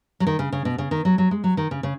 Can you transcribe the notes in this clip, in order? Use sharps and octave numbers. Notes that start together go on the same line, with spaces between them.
F#3
D#3
C#3
C#3
B2
C#3
D#3
F#3
F#3
G#3
F#3
D#3
C#3
C#3